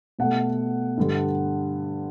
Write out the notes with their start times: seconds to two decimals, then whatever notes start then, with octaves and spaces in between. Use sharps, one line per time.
0.19 B2 A3 F#5
0.97 G2 D3 G3